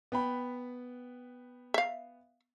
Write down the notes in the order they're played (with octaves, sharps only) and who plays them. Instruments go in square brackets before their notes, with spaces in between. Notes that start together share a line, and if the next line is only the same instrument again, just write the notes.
[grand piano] B3 G5 B5
[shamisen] E5 F5